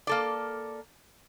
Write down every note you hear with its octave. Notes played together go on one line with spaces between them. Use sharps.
A#3 A4 D5